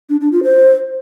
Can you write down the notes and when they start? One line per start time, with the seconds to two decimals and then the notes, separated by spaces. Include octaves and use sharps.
0.09 D4
0.21 D4
0.32 F4
0.44 C5